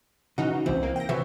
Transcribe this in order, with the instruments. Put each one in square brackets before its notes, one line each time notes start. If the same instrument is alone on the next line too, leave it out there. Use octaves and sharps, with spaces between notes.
[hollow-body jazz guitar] C#3 [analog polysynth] E3 D#4 F#4
[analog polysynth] C2 E3 [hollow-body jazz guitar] C4
[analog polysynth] A#3
G5 A#6
[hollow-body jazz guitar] C3 E3 F#3 [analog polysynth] E5